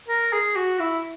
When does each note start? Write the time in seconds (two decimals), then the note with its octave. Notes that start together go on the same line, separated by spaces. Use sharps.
0.08 A#4
0.33 G#4
0.56 F#4
0.80 E4